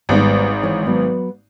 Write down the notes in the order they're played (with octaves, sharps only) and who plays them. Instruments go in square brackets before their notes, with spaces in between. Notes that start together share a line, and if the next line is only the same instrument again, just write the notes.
[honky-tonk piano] G#1 G#2 [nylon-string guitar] G3 B3
[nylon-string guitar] E3 C#5
F#3 B3